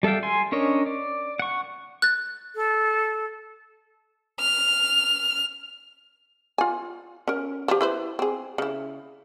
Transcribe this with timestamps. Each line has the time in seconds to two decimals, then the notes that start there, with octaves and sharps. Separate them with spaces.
0.03 G3 A4 E5 F5 G5
0.23 G#5 C6
0.52 C#4 D4 A#4 C#5 D#5
0.86 D5
1.39 F#5 C#6
2.02 F#6 A6
2.55 A4
4.40 F6
6.58 F4 G#5
7.28 C#4 A#4
7.68 F3 G4
7.81 E4 B4 C5
8.19 C4 G#4
8.58 C#3 E4